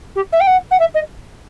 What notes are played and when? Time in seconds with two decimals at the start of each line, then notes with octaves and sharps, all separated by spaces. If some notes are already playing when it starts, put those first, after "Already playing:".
0.16 G4
0.33 E5
0.40 G5
0.47 F#5
0.71 F#5
0.80 E5
0.95 D#5